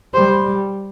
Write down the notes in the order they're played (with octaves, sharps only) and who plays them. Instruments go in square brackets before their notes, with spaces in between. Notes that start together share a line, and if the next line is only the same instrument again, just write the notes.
[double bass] G3 [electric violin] C5